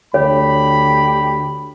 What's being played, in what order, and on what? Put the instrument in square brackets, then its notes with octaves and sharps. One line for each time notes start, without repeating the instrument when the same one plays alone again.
[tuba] D2 [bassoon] G4 [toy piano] C#5 [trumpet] B5